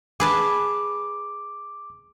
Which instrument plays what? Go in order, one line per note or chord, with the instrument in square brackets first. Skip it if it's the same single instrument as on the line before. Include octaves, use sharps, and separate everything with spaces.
[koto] G#4 B4 A5 [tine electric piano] D6